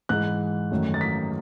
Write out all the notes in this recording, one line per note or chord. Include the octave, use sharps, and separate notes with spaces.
G#2 E3 G#3 F#6
F#2 D#3 A3
A6
B6